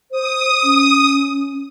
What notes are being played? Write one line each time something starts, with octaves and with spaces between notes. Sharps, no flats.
C5 D#6
C#4